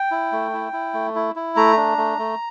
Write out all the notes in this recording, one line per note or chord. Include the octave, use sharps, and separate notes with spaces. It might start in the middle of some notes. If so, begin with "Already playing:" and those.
Already playing: G5
E4
A3
E4
E4
A3
E4
E4
A3 A#5
D4
A3
A3